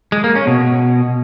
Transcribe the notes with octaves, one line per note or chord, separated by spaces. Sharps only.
G#3
A#3
C#4
B2